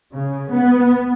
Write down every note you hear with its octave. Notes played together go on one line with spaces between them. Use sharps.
C#3
B3